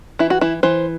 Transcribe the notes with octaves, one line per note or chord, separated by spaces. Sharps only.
E3 E4
F#4
E3 E4
E3 C5